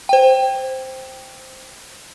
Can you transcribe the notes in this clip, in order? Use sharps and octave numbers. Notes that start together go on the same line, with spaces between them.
C5 G5